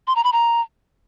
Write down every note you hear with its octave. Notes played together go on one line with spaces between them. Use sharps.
C6
A#5
B5
A#5